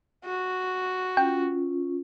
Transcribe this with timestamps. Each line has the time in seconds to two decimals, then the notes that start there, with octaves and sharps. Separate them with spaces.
0.25 F#4
1.17 C#4 F4 G5